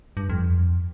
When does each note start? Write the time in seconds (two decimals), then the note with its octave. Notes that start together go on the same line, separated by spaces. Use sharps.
0.17 G2
0.30 F2